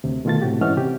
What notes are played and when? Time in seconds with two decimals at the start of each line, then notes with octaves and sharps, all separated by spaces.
0.04 D2 C3
0.25 B2 D#3 A3 F4 A4 A6
0.42 A2 C3 F#4 G4
0.61 G#2 E3 C#4 D#5 F#5 F6
0.77 C3 G4